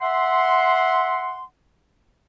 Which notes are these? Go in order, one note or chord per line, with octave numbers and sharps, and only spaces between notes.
E5 F#5 C6